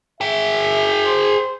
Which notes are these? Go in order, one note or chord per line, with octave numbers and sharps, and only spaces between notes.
G#4 E5 G5
C5